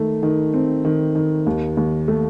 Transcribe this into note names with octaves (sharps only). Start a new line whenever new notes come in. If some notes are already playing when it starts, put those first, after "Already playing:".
Already playing: D#3 A3
D#3
C4
D#3
D#3
D#2
D#2
A3